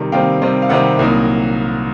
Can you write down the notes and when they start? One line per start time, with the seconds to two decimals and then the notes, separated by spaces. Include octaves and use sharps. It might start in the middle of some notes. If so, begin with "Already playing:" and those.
Already playing: C3 D#3 G3
0.12 C3 D#3 G3 C4 F5 G5
0.42 C3 D#3 G3 C4
0.62 F5
0.69 C3 D#3 G3 C4 E5 F#5
0.99 C2 A#2 F#3 A#3 D#4